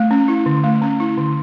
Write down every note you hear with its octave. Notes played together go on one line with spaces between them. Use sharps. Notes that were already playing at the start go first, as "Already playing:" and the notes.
Already playing: A3
C#4
E4
D3
A3
C#4
E4
D3